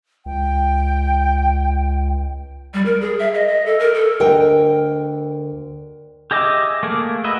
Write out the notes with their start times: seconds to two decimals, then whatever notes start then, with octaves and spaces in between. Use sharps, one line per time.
0.26 C#2 G5
2.74 G3
2.85 A#4
3.01 G#4
3.19 E5
3.34 D#5
3.48 D#5
3.66 A4
3.79 A#4
3.94 A4
4.20 D2 A#4 D#5 G5
6.31 G4 G#4 D#5 E5 D6
6.83 A3 A#3 G#4
7.24 F#4 A#4 B4 D#5 E5